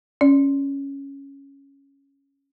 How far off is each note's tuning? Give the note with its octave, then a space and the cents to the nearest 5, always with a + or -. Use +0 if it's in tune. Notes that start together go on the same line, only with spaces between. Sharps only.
C#4 +0 D5 +0